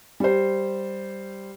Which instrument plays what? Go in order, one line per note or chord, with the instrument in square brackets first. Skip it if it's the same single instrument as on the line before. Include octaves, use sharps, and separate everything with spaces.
[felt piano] G3 C5